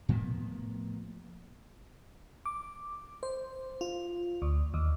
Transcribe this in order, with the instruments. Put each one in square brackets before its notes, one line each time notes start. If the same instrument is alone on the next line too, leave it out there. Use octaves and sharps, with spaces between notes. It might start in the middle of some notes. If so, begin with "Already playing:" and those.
[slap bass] A2 F3 A#3 B3
[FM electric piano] D6
C5
F4
D2
D#2